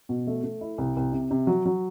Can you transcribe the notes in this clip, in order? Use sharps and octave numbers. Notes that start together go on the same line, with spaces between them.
B2
A3
A3
E4
C2
C2
C3
C3
F#3
F#3